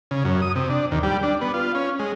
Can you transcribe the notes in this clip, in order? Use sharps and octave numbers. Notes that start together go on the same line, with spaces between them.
C#3
F#2
D#6
C3
D4
D#2
G3
D4
B3
F4
C#4
G#3